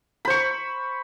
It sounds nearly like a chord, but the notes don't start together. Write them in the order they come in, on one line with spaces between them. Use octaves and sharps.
B5 C5 C#6